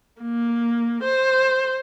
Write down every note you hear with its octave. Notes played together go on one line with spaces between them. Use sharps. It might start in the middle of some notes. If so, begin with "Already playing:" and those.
A#3
C5